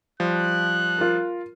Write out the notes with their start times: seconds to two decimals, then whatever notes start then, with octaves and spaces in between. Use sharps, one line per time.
0.20 F3 G3 F#6
0.98 F4 A#4